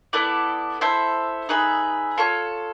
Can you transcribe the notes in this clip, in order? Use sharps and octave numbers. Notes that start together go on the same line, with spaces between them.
B3 E4 A4 D5
E4 A4 C5 E5
D#4 G#4 B4 E5
F4 A4 C#5